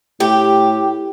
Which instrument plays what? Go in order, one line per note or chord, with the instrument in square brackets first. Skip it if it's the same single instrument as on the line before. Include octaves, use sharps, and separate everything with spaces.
[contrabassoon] A2 [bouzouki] G4